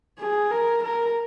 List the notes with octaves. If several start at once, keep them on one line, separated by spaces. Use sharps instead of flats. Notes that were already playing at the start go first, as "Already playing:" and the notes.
G#4
A#4
A#4